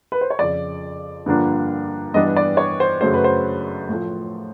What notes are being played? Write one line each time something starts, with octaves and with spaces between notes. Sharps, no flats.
B4
C5
C#5
F2 C#3 F3 D5
G2 D3 F3 A#3 D4
G2 E3 G3 B3 D4 D#5
D5
C#5
C5
F#2 C#3 F#3 A3 C#4 C5
B4
C5
A2 F3 A3